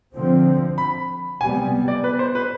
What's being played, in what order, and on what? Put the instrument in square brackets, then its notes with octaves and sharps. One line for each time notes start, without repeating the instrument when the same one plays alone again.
[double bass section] D3 F3 C4
[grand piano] B5
[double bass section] C3 G3 B3 [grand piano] G#5
[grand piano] D5
B4
C5
B4